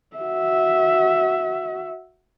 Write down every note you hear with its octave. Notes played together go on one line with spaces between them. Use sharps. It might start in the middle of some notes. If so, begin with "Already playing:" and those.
F#4 E5